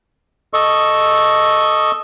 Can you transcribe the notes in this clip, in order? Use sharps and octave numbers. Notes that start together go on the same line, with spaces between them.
A4 D#5 C#6